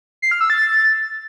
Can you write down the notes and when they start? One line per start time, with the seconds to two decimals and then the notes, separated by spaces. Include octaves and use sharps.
0.22 C7
0.31 F6
0.41 E6
0.50 A6